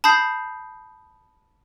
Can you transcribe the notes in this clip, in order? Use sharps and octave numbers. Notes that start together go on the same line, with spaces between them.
A5 B5 D#6 G6 C7